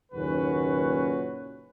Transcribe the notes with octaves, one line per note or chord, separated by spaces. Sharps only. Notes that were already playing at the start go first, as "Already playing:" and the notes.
F#1 D#2 A#2 C#4 F#4 B4